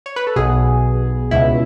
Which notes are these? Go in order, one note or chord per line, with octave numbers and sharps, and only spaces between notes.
C#5
B4
A4
B1 B2 G#4
C#2 B2 E4